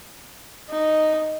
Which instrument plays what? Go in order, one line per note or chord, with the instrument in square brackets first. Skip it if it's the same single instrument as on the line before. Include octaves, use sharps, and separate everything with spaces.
[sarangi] D#4